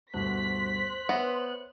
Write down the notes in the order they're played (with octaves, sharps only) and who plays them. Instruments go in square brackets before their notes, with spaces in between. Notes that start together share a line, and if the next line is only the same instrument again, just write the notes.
[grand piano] D2 G2 B2 [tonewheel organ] C5 F#6 [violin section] B6
[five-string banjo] B3 [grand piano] C#5 E5 A#6